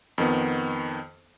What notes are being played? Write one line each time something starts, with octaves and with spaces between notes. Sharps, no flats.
F2 D#3 B3